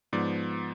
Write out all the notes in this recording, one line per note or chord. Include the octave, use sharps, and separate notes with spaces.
G#2 F3 B3 D5